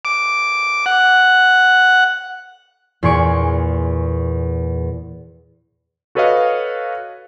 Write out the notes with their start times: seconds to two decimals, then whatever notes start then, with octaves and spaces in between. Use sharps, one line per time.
0.05 D6
0.86 F#5
3.03 E2 A#2 G#4 C6 C#6 D7
6.15 F#4 A4 B4 C#5 D#5 F5